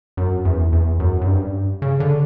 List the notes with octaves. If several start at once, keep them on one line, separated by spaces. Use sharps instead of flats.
F#2
E2
E2
F#2
F#2
G2
C#3
D3